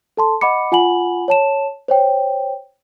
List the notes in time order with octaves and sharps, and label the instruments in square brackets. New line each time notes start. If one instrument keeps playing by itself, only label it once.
[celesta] A4 A5 C6
D#5 F#5 B5 D6 C#7
F4 F#5 G#5 B5 F#7
C#5 A5 E7
C5 C#5 G5